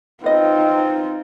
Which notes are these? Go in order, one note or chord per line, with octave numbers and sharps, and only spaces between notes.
C4 D#4 F4 B4 D#5